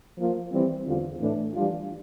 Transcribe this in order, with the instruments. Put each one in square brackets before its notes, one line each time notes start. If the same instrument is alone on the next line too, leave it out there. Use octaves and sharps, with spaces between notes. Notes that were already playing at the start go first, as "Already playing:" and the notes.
[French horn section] F3 A#3 F4
E3 G3 C4
E2 D3 G3 C4 F4
A2 E3 A3 D4
E3 G3 D4 F4